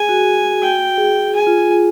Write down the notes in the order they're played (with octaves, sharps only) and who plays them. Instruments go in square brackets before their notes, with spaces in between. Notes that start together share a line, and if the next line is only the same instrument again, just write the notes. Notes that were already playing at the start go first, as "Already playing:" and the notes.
Already playing: [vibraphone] G#4 [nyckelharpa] G#5
[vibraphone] F#4
[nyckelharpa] G5
[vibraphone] G#4
[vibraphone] G#4 [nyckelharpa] G#5
[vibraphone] F4
F4